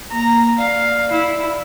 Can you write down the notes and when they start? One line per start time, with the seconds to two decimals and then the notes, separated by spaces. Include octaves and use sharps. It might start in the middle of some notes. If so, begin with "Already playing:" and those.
0.12 A#3 A#5
0.58 D5 F5
1.11 E4